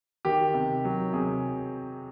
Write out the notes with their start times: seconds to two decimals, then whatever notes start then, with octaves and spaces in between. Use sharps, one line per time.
0.25 D#3 G4
0.54 C3
0.85 F#3
1.13 C3 G#4